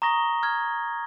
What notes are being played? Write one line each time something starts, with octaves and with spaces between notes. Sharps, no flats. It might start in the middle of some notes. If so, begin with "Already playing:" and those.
A#5 C#6 D#6 A#6 G7
F6 G#6